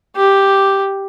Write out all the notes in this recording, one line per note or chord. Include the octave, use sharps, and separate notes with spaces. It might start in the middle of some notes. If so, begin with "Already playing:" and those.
G4